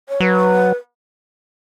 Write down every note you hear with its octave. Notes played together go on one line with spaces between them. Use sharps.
C#5
F#3 B4